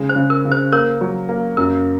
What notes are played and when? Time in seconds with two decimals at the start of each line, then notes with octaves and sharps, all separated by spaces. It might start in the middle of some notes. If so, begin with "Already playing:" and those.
Already playing: C#3 G#3
0.09 C5
0.16 C#3
0.30 A#4
0.45 C#3
0.51 C5
0.72 A#3 A#4 C#5
1.01 F#3
1.29 A#3
1.57 F#2 A#4